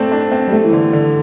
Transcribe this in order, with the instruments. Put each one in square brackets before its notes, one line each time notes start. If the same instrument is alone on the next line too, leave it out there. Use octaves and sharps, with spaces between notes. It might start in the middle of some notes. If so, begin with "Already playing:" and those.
Already playing: [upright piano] A3 C4 D4
D4
C4
G3
A3
E3
D3
D3